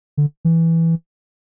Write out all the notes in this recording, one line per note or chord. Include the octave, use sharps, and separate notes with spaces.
D3
E3